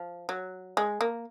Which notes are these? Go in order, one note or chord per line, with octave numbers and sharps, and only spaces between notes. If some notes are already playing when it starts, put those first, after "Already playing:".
Already playing: F3
F#3
G#3
A#3